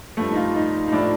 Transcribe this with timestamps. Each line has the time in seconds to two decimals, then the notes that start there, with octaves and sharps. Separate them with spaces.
0.17 G2 F3 A3
0.32 D#4
0.36 F4
0.55 D#4
0.88 D#4
0.92 A2 F3 D4